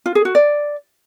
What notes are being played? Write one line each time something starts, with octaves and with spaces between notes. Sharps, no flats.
F4
G#4
F#4
D5